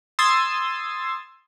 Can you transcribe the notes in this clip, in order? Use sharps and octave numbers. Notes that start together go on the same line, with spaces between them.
C6 D#6 E6 G#6 A6